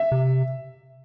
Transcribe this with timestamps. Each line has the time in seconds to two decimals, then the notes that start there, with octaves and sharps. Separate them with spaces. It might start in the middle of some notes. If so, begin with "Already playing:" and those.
Already playing: E5
0.12 C3